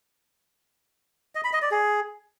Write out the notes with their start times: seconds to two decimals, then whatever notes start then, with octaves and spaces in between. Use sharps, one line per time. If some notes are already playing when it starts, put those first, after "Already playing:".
1.35 D#5
1.44 B5
1.53 D#5
1.62 D5
1.71 G#4